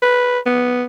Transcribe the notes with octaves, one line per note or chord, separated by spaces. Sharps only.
B4
B3